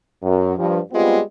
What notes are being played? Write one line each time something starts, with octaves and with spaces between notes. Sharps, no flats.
F#2
G2 F3
G3 G#3 B3 C4 F4